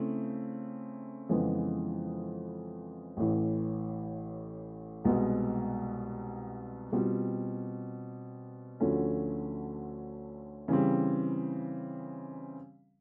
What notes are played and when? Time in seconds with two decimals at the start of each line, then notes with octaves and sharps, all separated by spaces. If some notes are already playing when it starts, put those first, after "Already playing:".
Already playing: C#3 A3 C4 E4
1.29 F2 C#3 E3 G#3 B3
3.17 A1 A2 E3
5.05 C2 B2 G#3 B3
6.92 B2 G3 C4 F4
8.80 D2 D3 F3 A3 C#4
10.68 C#3 E3 G3 C4